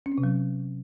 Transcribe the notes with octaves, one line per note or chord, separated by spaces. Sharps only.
C#4
C4
C3
F#3